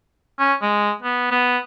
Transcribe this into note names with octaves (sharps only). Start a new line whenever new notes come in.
C#4
G#3
B3
B3